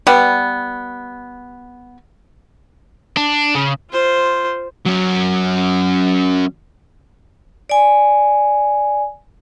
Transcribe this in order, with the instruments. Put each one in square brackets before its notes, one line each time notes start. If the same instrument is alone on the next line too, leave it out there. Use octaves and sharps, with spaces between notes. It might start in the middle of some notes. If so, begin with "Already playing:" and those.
[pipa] G3 B3
[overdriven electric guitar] D4
C#3
[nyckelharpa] F4 C5
[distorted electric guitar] F#3 C#4
[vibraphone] D5 G#5